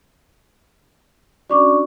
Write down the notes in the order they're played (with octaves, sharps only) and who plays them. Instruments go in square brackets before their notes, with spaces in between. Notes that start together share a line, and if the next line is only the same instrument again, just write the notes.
[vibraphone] C#4 D4 F#4 [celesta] D5 C#6 D6